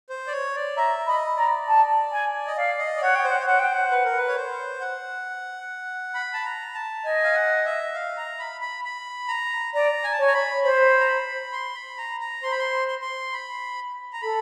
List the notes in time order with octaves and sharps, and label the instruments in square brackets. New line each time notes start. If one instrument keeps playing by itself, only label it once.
[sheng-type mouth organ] C5
D5
C#5
D5
[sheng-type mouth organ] E5 [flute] A#5
[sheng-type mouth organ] D#5 [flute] B5
[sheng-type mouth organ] D5 [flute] A#5
[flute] A5
G#5
[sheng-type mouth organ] D#5
[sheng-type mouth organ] D5 [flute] F5
[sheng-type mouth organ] D#5
D5
[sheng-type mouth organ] C#5 [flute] F#5
[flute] G5
[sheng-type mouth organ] C5
[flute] F#5
[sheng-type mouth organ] C#5
[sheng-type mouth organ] C5 [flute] F#5
[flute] G5
F#5
[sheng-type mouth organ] B4
A#4
B4
C#5
C5
F#5
B5
A5
A#5
A5
[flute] D#5 [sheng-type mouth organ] G#5
[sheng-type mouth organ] F5
F#5
E5
F5
A#5
B5
B5
B5
A#5
[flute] D5 [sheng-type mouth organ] A#5
[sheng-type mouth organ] G#5
A5
[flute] C#5 [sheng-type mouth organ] G#5
[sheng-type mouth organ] A#5
B5
[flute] C5 [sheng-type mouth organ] B5
[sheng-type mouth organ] A#5
B5
C6
B5
A#5
A#5
[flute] C5 [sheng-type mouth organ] C6
[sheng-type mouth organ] B5
C6
C6
C6
B5
A#5
[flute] A4 [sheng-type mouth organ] B5